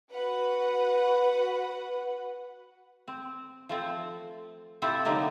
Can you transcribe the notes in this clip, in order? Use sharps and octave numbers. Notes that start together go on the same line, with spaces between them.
F#4 B4 F#5
C4
F3 A3 C4
C3 C4 E4 F4 G4 A4
D3 F#3 A3 A#3 D#4 G4